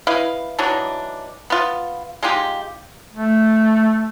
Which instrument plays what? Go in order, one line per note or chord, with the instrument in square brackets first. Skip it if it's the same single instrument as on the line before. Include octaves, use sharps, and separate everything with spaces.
[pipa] E4 B4 D#5 F5
E3 F#3 D4 D#4
B3 F4
G#3 D#4 F4 G4
[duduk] A3